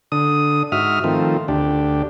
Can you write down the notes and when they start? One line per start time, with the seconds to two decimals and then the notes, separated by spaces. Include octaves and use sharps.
0.12 D3 D#6
0.72 G#2 F#4 E5 D#6 F6
1.04 D#3 F3 A3 C4
1.48 D2 D4 G4